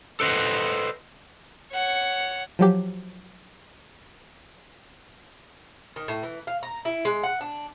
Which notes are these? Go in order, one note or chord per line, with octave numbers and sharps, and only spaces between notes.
A4 B4 C5 D#5 F#5
C#5 F#5
F3 F#3 G4
D#3
A2
E3
F5
A#5
E4
G#3
F#5
D4